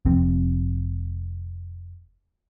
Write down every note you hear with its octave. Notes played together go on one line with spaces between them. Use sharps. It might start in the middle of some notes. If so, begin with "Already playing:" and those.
F1 F2 C4